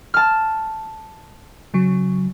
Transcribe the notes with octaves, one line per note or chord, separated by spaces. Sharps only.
A5 F6
C#3 F#3